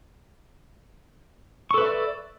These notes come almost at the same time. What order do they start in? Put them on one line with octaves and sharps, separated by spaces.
C#6 A4 B4 E5 D5